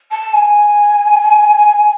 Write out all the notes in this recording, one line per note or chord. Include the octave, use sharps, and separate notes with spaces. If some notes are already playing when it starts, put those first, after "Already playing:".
A5
G#5